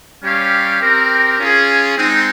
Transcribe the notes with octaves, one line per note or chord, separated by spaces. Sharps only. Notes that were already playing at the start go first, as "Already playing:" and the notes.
G3 C#4 G4 C#5 F5
C4 G4 A#4
C#4 F4 G#4
G#3 C4 D#4